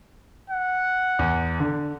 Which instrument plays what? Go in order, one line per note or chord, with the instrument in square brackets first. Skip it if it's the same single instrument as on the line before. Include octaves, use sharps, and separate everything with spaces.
[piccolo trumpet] F#5
[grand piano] E2
D3